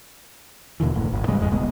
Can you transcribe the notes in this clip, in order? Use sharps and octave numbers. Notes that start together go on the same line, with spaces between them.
D#2 B2 D3 E3
F#1 A2
G1
G#2 C#3 G3 G#3
F1 E2 G#3
D1 B1 G#3 B3